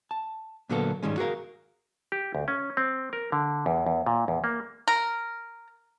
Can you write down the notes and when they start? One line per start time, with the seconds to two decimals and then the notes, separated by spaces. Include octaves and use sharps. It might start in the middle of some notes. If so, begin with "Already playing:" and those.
0.11 A5
0.69 A#2 D3 F#3 A#3 B3 A4
1.03 G#2 D#3 G3 G#3 C#4
1.18 F#4 G#4 A#4 F5
2.12 G4
2.35 D2
2.48 C#4
2.77 C4
3.13 A#4
3.32 D3
3.66 E2
3.86 E2
4.06 A#2
4.28 E2
4.44 A#3
4.88 A#4